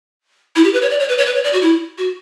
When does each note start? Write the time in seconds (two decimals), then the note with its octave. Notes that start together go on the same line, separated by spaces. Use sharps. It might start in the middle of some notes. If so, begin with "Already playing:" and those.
0.56 E4
0.64 G4
0.73 B4
0.82 C#5
0.91 D5
1.00 C#5
1.09 B4
1.18 C#5
1.26 B4
1.36 C#5
1.44 D5
1.53 F#4
1.62 E4
1.98 F#4